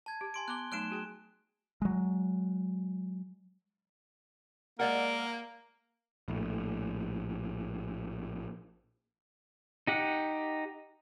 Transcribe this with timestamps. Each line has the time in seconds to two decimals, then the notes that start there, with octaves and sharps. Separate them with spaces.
0.06 A5 G#6
0.21 G4
0.34 G#5 C6 D7
0.48 B3 A#5 D6 F#6 G7
0.72 F#3 A3 D#4 F#6 D7 E7
0.90 F#4 G#4 G5
1.82 F#3 G#3
4.80 G#3 A#3 A#4 D5 F#5
6.28 A#1 A2
9.87 D#4 G4 F#5